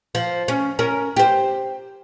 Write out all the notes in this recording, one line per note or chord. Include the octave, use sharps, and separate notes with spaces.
F3
C#4
C#4 A#4
G4 C5